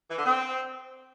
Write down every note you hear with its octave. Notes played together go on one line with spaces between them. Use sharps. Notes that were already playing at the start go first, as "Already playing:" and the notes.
E3
D3
C4